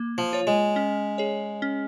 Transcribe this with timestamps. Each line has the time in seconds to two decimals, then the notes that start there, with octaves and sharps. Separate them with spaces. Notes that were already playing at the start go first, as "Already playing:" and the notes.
Already playing: A#3
0.18 F3
0.33 F4 C#5
0.47 G#3
0.76 C#4
1.18 G#4 C#5
1.62 C#4